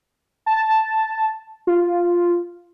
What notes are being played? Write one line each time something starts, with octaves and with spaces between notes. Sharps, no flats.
A5
F4